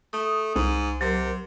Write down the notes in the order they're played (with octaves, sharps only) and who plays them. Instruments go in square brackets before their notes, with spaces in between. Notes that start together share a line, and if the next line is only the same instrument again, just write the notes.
[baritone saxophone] A3 [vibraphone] D#6
[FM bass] C2 [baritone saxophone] G#2
[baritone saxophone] C3 [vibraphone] F#3 A#4